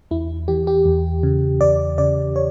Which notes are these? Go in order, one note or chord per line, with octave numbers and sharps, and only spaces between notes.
E2 E4
E3 G4
G4
E2
C#3
E2 D5
C#3 D5
C#5